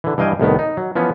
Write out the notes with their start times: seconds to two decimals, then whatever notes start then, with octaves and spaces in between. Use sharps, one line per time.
0.04 D3 E3
0.18 G2 E3 D#5 F5 G5 G#5
0.40 C2 A2 D#3 B3
0.59 D#4
0.77 F#3
0.95 E3 F3 B3 C#4